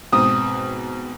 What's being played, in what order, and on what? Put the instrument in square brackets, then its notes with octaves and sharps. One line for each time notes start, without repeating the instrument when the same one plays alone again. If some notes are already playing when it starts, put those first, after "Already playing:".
[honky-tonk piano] G#2 B2 C4 [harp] D#6